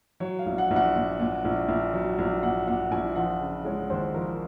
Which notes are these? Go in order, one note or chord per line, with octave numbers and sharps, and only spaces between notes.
F#3 C#5
F5
A#1
F#5
A#1
F#5
A#2
A#2
A#1
A#1
F#3
A#1
A#2 F#5
A#2 F#5
A#1 G#5
F3 F#5
C#3
G#3 C#5
D#2 C5
F3 A#4